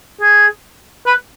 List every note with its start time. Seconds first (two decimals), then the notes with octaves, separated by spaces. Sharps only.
0.21 G#4
1.06 B4